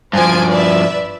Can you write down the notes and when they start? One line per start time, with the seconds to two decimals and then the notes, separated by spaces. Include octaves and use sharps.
0.13 G2 F3 C5 G#5 D7
0.50 B4 D5 E5